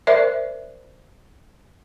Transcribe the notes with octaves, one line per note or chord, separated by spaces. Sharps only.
A#4 C5 D5 E5